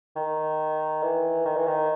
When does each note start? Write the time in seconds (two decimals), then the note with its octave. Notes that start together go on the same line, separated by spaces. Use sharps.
0.16 D#3
1.03 E3
1.45 D#3
1.56 E3
1.67 D#3